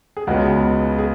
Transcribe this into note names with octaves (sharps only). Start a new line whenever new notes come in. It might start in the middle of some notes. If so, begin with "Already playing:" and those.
G#4
C#2 C#3 G#3 B3 F#4
G#4